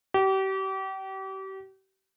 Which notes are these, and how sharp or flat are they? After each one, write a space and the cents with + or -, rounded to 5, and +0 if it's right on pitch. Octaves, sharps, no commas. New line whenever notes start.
G4 -35